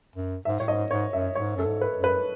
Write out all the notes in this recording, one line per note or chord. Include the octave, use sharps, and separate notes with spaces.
F#2
G#2 E5
A2 C#5
G#2 D#5
G#2 C#5
F#2 E5
G#2 C#5
F#2 A4
G#2
B4
F#2
B4